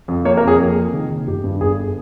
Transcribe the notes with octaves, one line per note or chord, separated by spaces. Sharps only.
F2
A#3 C#5
A#4
F2
G#4
F2
A#3
D#3
D#3
G1 G4
G2
G1 G#4